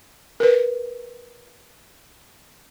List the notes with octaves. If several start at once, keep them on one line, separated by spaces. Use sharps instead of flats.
A#4 B4